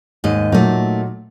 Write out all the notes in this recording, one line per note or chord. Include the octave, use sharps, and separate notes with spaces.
D#2 G#2 D#5
A#2 F#3 A3 D#4